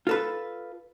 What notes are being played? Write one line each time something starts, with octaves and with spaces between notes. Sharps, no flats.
F4 A4 B4